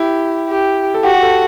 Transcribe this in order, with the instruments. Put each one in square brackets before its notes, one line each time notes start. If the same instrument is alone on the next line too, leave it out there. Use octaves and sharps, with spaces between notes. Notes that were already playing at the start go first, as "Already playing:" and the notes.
Already playing: [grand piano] E4 [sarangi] G4
[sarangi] G4
[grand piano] A4
[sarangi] F#4 [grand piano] G4
[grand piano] G4
A4